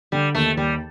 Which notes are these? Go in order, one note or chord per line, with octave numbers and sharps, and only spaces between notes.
D3 G3
D#2 A3
D#2 G3